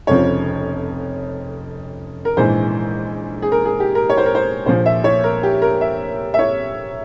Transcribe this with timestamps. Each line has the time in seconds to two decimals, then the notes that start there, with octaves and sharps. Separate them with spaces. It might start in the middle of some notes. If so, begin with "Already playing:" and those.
0.07 F1 F2 C#3 F3 C#5
2.25 A#4
2.37 A#1 G#2 E3 C5
3.42 G#4
3.52 A#4
3.65 G#4
3.80 G4
3.95 A#4
4.10 C#5
4.17 C5
4.26 A#4
4.35 C5
4.66 A#1 A#2 F3 C5
4.86 E5
5.04 C#5
5.24 A#4
5.43 G4
5.62 A#4
5.81 E5
6.34 E5
6.39 C#5